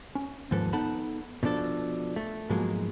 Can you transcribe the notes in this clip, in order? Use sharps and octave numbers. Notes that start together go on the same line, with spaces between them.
C#4
D#2 G#2 F3 A4 B4
B3 D#4 A4 F#5 A5 B5
B2 F3 D4 A4
A3
G#2 B2 F3 F#3 G#3 A#3